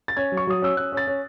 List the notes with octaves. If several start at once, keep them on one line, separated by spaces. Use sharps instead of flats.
A6
C#4 G#6
F#3
C#6
F#3 D#6
C#4 E6
C#4 F#6
C#4
A6
C#4